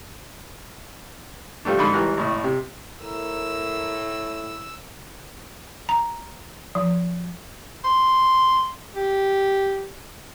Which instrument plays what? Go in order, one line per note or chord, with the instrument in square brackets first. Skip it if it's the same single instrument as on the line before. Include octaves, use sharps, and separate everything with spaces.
[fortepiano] F3 G3 A3 D4
G#2 D3 B5 D#6
G#1 G#2 E3 G3 A#4 F#6
G#1 A2
C3
[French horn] A2 [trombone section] A#4 [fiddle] E6
[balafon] A#5
F3
[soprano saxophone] C6
G4